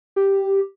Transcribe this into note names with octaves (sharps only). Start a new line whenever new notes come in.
G4